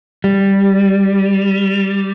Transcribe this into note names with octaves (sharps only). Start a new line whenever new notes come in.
G3